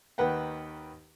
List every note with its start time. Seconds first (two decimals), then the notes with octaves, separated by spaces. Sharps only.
0.18 D#2 D#3 B4 F#5 G5